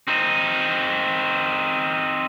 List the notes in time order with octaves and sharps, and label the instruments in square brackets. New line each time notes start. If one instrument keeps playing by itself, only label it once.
[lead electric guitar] C4 D#4